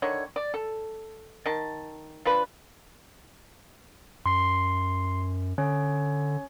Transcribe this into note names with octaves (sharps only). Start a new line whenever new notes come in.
D3 D#3 C#5
D5
A4
D#3 A5
F3 D4 B4
F#2 C6 C7
D3 C#4 C#5